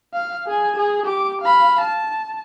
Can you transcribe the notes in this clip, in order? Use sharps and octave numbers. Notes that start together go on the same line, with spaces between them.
F5
G#4 G#5
G#4
G4 D6
F5 B5
A5